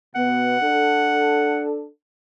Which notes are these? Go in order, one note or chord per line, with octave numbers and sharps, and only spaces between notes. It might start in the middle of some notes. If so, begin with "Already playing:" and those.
B2 B3 F#5
D4 A4